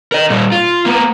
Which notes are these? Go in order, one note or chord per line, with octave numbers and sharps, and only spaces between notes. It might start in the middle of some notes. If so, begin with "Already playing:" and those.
A#4 D#5
A#2 G3
F4
A#3 B3